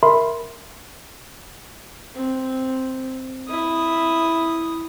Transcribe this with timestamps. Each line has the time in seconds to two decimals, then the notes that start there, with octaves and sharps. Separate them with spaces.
0.03 A#4 E5 B5 C6
2.15 C4
3.48 E4 D#6